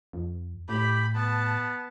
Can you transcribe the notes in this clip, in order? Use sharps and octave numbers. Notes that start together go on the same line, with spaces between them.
F2
A2 G4 B5
B3 A5